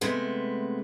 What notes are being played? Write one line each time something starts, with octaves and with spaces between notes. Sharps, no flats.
C3 G#3 A3 B3